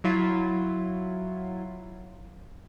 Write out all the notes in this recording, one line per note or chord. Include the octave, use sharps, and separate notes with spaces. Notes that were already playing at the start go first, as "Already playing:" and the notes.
F#3 E4 F4